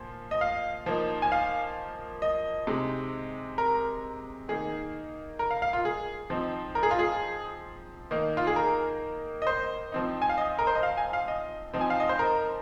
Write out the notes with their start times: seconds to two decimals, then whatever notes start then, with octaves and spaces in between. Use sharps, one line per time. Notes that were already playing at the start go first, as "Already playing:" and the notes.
Already playing: A#2 F3
0.31 D#5
0.41 F5
0.86 F3 A#3 D#4
1.22 G#5
1.32 F5
2.22 D#5
2.67 C3 G#3 D#4
3.58 A#4
4.48 D#3 A#3 D#4 G#4
5.39 A#4
5.51 F5
5.62 F5
5.73 F4
5.85 G#4
6.30 F3 C4 D#4
6.75 A#4
6.83 G#4
6.91 F4
6.99 G#4
8.11 D#3 A#3 D#4
8.37 F4
8.47 G#4
8.56 A#4
9.42 D#5
9.47 C5
9.92 F3 C4 D#4
10.22 G#5
10.29 F5
10.38 D#5
10.59 A#4
10.67 C5
10.75 D#5
10.83 F5
10.98 G#5
11.13 F5
11.28 D#5
11.73 F3 C4 D#4
11.81 G#5
11.90 F5
12.00 D#5
12.09 C5
12.19 A#4